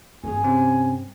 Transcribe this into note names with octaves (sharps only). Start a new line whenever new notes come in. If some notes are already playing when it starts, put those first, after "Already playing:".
G#1 G2 G#4 G#5
C3 C4 C#4